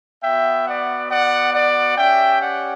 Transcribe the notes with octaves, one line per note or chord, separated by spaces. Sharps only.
B3 F#4 E5 G5
D5 F#5
D5 F#5
D5 F#5
C#4 G4 E5 G5
D5 F#5